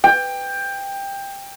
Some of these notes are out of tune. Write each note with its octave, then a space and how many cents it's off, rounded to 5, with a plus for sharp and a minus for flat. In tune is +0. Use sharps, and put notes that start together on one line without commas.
G5 +15